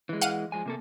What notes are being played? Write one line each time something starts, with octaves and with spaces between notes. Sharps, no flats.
E3 G#3
F5 F#5 D#7
F3 G#3 G#5
C3 A#3 A4